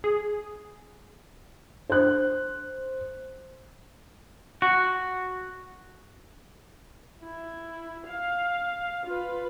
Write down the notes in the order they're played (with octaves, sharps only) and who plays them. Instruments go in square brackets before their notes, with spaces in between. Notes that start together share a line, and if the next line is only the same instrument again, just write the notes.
[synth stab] G#4
[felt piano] C5 F#6
[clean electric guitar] F#4
[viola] E4
F5
F4 B4